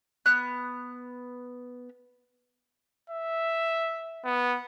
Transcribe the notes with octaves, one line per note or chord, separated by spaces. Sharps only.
B3 F#6
E5
B3